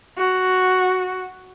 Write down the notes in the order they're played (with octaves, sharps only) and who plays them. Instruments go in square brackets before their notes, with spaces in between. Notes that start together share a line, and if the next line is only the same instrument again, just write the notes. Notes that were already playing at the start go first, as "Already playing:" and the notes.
[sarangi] F#4